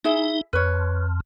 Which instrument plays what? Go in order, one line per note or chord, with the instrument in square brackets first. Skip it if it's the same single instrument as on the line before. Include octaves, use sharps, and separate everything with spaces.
[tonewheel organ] D#4 [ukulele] E4 G#4 E5
[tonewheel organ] F2 [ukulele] B4 C#5